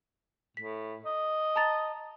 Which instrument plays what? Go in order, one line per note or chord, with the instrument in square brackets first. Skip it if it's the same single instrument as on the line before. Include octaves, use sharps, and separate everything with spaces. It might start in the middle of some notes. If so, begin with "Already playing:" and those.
[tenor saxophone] A2 [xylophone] B6
[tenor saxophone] D#5
[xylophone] A5 A#5 A6